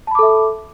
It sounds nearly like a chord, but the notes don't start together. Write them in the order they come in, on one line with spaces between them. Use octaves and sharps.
A5 B5 D6 A4 E5